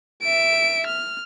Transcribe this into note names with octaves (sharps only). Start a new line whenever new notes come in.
E5 D7
F6